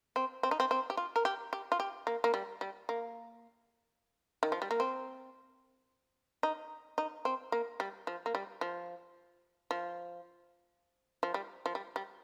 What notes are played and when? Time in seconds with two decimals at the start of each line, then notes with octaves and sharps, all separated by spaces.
0.16 C4
0.43 C4
0.51 D#4
0.60 C4
0.71 C4
0.90 G4
0.97 F4
1.16 A#4
1.25 G4
1.53 G4
1.72 F4
1.80 G4
2.07 A#3
2.24 A#3
2.34 G3
2.61 G3
2.89 A#3
4.43 D#3
4.52 F3
4.62 G3
4.71 A#3
4.80 C4
6.43 D#4
6.98 D#4
7.25 C4
7.52 A#3
7.80 G3
8.07 F3
8.26 A#3
8.35 G3
8.61 F3
9.71 F3
11.23 F3
11.34 G3
11.66 F3
11.75 G3
11.96 G3